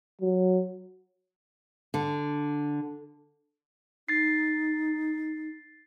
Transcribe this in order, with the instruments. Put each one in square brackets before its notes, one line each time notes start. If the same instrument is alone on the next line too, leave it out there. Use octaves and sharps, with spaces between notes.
[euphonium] F#3
[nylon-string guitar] D3
[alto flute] D#4 [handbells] A6 C7